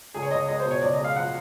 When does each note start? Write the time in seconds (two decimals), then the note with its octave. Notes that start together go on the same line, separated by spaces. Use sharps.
0.14 C#2 G#4
0.23 C#5
0.31 C#2 D#5
0.48 G#3 D#5
0.60 C5
0.65 B2
0.71 C#5
0.82 C#2 D5
0.93 D#5
1.00 G#3 F5
1.16 F3 F#5